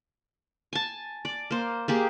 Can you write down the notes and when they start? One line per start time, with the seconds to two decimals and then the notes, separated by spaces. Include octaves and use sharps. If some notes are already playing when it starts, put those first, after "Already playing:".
0.73 G#5 A5
1.25 D5
1.50 A#3 C5
1.88 A#3 G4 G#4